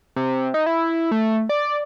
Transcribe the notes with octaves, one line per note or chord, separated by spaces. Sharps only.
C3
D#4
E4
A3
D5